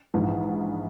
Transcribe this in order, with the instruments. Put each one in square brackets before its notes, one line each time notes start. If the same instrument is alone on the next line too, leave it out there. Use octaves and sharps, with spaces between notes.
[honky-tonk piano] A#1 G#2 E3